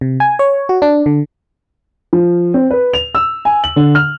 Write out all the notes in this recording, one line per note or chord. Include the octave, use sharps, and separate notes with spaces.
C3
G#5
C#5
F#4
D4
D3
F3
C4
B4
F7
E6
G#5
F#7
D3
F6